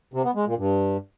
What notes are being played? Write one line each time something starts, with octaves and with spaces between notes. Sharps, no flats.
C3
B3
G#3
A#2
G2